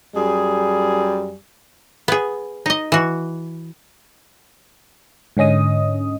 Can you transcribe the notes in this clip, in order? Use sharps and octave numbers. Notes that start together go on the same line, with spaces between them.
F#2 G3 G#4
B3 G#4
D#4 D#5
E3 F#4
G#2 D3 C#4 D#5 D#6